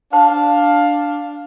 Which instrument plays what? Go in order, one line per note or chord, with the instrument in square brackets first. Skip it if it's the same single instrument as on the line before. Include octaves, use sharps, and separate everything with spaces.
[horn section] D4 F5 [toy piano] C5 A5